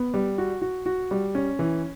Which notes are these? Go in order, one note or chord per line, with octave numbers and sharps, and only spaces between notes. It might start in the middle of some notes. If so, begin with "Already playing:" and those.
Already playing: B3
G3
F#4
F#4
F#4
G3
C#4
E3